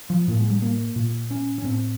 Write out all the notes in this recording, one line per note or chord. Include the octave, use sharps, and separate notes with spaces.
F3
A2 A#3
G#3
G3
A#3
A#2
C#4
C#4
A2 C4